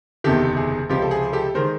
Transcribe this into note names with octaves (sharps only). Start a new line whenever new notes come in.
F#1 E2 C3 D#3 G4 A4
G#4
C#2 C3 F3 G4
A4
G#4
G4 A4
D#3 G#3 A#4 C5